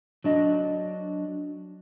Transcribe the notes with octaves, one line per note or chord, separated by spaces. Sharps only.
F#3 D4 D#5